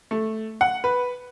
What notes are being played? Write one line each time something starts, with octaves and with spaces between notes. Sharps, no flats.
A3
F#5
B4